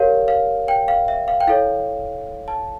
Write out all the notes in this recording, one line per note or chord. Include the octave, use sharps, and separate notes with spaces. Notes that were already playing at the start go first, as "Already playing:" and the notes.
Already playing: G4 A#4 C#5 F5
F5
G5
F5
E5
F5
G5
E4 A4 C#5 F5
A5